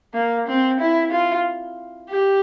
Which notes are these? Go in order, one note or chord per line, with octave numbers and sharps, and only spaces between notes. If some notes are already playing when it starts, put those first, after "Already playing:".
A#3
C4
E4
F4
G4